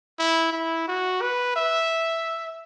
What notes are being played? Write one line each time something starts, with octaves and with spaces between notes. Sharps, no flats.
E4
E4
F#4
B4
E5